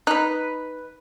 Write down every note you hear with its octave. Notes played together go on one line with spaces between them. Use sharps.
D#4 B4 F#6